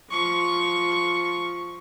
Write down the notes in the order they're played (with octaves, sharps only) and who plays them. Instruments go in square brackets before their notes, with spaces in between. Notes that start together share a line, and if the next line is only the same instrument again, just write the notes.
[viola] F3 C#6